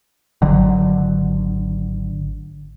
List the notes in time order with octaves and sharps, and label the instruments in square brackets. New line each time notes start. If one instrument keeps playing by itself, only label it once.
[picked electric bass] G#1 D3 F#3